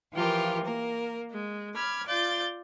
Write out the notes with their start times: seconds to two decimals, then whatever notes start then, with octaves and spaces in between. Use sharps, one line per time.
0.13 E3 F3 F4 G4 A#4
0.65 A#3 A#4
1.30 G#3
1.75 B5 D6 F6 G#6
2.07 F4 D5 G6 A6